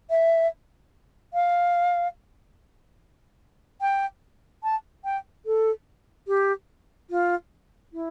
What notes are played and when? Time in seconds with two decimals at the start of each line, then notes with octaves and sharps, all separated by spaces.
0.10 E5
1.33 F5
3.81 G5
4.63 A5
5.04 G5
5.46 A4
6.28 G4
7.10 F4
7.93 E4